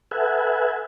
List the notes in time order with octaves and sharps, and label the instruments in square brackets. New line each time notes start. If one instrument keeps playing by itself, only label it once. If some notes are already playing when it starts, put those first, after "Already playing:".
[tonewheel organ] A4 B4 E5 F#5 G#5